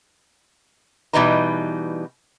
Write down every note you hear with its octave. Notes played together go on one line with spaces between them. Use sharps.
B2 E3 G3 D#4 B4 A#5